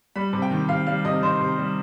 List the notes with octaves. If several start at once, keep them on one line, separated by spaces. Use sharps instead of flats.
G3 B5
C3
G5
D#3
C3 F5
G3 F5
C3 D#5
D#3 C5
C3
G3